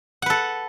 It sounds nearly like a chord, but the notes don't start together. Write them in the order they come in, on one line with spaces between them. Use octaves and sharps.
F#5 B4 A4